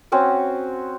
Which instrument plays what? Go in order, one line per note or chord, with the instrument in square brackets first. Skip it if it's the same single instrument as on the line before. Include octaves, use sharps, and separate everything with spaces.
[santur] C4 C#4 F#4 F#5